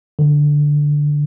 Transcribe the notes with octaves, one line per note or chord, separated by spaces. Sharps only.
D3